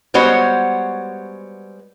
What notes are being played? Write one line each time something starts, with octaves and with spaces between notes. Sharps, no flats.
G3 G#3 B3 F#4 C5 C#5